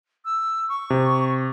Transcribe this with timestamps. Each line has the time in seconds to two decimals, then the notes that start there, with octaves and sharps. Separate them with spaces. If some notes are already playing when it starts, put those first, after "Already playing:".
0.25 E6
0.69 C#6
0.90 C3